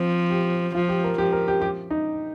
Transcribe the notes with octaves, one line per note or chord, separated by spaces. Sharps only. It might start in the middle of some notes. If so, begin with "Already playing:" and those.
Already playing: F3 C4
G4
F3 F4
G4
A#4
F3 G4
A#4
G4
G4
D#4